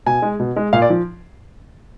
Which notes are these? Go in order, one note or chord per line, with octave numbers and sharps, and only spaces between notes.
B2 G#5
G#3
B2
G#3
A#2 F5
D5
F3